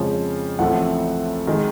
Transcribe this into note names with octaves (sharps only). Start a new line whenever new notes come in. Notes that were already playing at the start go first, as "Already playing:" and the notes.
Already playing: F2 C#3 F3 G#3 C#4
A1 A2 F3 A3 C4 F#5
D#3 G#3